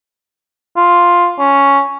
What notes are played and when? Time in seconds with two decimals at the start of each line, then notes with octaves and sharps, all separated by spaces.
0.77 F4
1.39 C#4